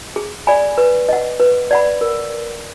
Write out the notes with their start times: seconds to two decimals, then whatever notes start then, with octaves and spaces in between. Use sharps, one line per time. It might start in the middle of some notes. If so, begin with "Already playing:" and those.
0.16 G#4
0.47 D5 G#5 B5
0.78 B4
1.09 D#5 F#5
1.40 B4
1.71 D5 F#5 B5
2.01 A#4